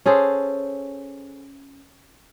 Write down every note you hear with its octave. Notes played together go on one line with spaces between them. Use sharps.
C#4 G#4 A4 C5